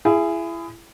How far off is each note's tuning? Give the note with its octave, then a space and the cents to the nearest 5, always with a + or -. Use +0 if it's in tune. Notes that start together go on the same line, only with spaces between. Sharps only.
E4 +30 G#4 +0